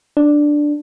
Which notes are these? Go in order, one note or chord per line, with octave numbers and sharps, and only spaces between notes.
D4